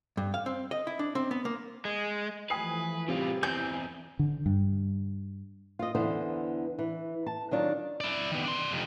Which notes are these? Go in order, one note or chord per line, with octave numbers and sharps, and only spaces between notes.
G2
F5
C4
D#5
E4
D4
C4
B3
A#3
G#3
E3 F3 A3 B4 G#5 D#6 C7
A2 C3 G3 F4 G#4 B4 A6
E2 C4 E4 G#5 G6
D3
G2
F4 D#5
E2 D3 E3 C5
E3
A5
D#3 F#3 D4 F4
E4 D5
D#3 B3
D4 C6
F2 C3